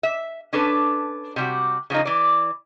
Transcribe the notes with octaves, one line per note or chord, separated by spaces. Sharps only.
E5
C#4 D4 A4 B4
C3 G3 F#4
C#3 F3 A#3 D#4
E3 D5